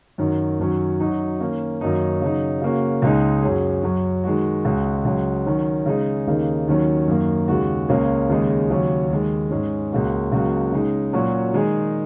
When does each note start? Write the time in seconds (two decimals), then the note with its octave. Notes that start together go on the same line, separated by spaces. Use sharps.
0.18 F#2 D#3 F#3
0.59 F#2 D#3 F#3 C#4
1.00 F#2 F#3 D#4 F#4
1.40 D#3 A#3 C#4
1.81 F#2 D#3 F#3 A#3 D#4
2.22 C#3 F#3 D#4
2.61 C#3 A#3 C#4 F#4
3.02 C#2 C#3 G#3 D#4 G#4
3.42 F#2 F#3 C#4 G#4
3.83 F#2 F#3 C#4
4.24 D#3 G#3 F#4
4.65 C#2 C#3 G#3 F#4
5.05 C#2 C#3 F#3
5.46 D#3 F#3 C#4
5.86 C#3 G#3 D#4
6.27 D#2 C#3 A#3 D#4
6.67 D#2 D#3 F#3 C#4
7.08 F#2 D#3 A#3
7.48 D#2 C#3 G#3 F#4
7.89 C#2 C#3 A#3 C#4 G#4
8.29 D#2 C#3 G#3 D#4
8.70 D#2 C#3 F#3 C#4
9.10 D#2 D#3 G#3
9.51 G#2 G#3 C#4
9.92 C#2 C#3 A#3 F#4
10.32 C#2 C#3 F#3 A#3 F#4
10.72 C#3 G#3 D#4
11.13 A#2 F#3 C#4 F#4
11.54 D#3 G#3 D#4 G#4